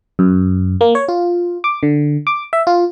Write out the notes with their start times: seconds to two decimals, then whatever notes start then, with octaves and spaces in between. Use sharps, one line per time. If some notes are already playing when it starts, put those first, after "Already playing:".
0.19 F#2
0.81 A#3
0.95 C#5
1.08 F4
1.64 D6
1.83 D3
2.27 D6
2.53 E5
2.67 F4